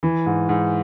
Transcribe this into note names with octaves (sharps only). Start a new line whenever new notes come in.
E3
G#2
G#2